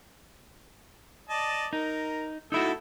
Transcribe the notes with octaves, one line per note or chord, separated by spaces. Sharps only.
D5 D#5 A5
D#4 A#4
A3 D#4 E4 F#4 A4 E6